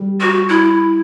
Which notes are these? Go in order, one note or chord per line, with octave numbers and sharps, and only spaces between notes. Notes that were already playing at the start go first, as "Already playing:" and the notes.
Already playing: G3
F#4
E4